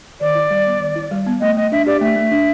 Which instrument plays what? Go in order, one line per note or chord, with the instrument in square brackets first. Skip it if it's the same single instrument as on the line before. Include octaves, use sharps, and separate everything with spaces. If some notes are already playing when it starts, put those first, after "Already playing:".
[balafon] D#3 [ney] D5
[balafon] E4
G3
B3
D#3
E4
G3
B3
[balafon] A3 [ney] D#5
[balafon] A3 [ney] D#5
[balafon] D4 [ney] E5
[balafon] G4 [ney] D5
[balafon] A3 [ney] E5
[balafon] A3
D4